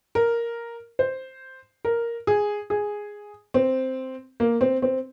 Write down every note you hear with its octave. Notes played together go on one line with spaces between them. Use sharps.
A#4
C5
A#4
G#4
G#4
C4
A#3
C4
C4